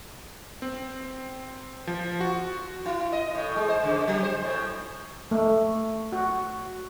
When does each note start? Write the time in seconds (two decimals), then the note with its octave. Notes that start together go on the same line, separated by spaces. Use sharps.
0.62 C4
1.87 F3
2.21 F#4
2.86 E4
3.13 D#5
3.35 A2
3.56 G#3
3.68 C5
3.84 C#3
4.08 F#3
4.23 C5
4.43 A2
5.31 A3
6.12 F#4